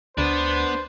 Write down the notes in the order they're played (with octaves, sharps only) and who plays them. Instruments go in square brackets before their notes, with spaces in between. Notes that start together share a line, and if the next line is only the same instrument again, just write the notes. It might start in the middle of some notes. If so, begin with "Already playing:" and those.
[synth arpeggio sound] D2 [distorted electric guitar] B3 B4 [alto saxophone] D4 [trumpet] C5